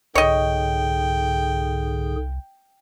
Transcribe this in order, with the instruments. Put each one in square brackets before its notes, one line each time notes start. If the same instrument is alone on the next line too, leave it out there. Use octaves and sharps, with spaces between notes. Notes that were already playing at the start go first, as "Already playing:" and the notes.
[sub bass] C2 [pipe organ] G#2 D3 G#4 [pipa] C#5 D#5 [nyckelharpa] G5